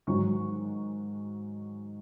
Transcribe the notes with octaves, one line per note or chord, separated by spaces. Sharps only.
G#2 D#3 F#3 C#6